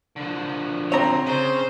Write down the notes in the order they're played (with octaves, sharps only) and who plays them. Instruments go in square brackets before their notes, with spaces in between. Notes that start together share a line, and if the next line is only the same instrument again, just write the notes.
[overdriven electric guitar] D3 F3
[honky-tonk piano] C4 [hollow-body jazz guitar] C#5 A#5
[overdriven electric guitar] C#3 [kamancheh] C5